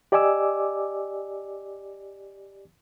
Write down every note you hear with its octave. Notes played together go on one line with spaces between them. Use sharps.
G4 D5 D#5 G#5 D6 E6